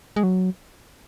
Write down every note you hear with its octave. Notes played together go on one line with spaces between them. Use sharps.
G#3
F#3